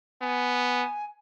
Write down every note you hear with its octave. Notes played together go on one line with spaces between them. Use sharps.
B3 G#5